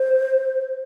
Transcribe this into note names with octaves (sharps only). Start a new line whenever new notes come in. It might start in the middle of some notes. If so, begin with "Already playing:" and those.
Already playing: C5